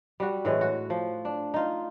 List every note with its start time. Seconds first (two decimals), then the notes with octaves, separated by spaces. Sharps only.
0.20 G3 F#4
0.45 A2 E3 G#3 C#5
0.61 F#4
0.90 F3
1.25 D4
1.54 D#4 F4